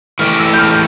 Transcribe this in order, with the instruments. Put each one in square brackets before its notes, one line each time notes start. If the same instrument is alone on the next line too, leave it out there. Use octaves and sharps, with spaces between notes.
[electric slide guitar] E3 A3 E4 G4 [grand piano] F6
[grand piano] E6
G6
F6